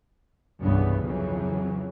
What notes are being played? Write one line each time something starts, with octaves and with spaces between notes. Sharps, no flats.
C2 G2 C#3 E3 G3 B3
F2 C#3 E3 F#3